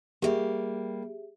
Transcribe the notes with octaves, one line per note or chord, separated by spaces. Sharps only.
G3 A#3 G4 G#4 E5